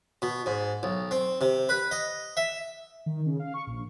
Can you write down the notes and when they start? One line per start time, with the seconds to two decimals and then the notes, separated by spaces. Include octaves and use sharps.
0.22 B2
0.46 G#2
0.83 B1
1.11 C4
1.41 C3
1.69 B4
1.91 D#5
2.37 E5
3.06 D#3
3.26 C#3
3.39 F5
3.54 C#6
3.67 A#1